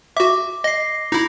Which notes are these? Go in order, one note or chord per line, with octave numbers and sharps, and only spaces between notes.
F#4 E5 D6
D#5 A#6 C7
D#4 E4 A#6